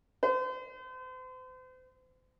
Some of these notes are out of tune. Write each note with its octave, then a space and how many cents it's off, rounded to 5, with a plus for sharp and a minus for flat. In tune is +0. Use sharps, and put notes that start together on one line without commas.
C5 -40